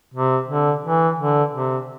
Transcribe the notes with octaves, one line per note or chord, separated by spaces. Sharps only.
C3
D3
E3
D3
C3